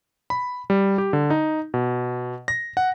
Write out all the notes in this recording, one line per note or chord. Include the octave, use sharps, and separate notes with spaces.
B5
G3
G4
D3
D#4
B2
A#6
F#5